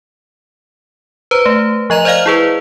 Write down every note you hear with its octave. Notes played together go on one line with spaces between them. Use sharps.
B4 C5 A#5
A3
F3 D#5 A#5 F7
C5 D5 D#5 F5 F6
E4 G#4 B4